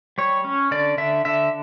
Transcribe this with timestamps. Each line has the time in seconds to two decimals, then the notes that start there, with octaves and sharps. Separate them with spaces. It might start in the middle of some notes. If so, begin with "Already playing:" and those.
0.18 G3 C#5
0.45 C#4
0.71 D3 D5
0.98 D3 E5
1.25 D3 E5